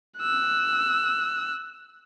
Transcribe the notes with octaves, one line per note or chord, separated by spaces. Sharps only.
E6 F#6